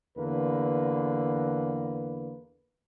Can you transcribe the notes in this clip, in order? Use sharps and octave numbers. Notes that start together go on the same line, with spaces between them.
E2 D3 A#3 B4